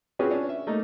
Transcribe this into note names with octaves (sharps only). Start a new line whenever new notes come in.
C4 C#4 F4 F#4 G#4 B4
C#4 D4
E5
A3 A#3 D#4